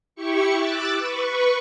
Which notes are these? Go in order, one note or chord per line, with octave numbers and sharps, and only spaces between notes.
E4 G4 C#6 C#7
D6 E6 F#6 A6
B4 C#6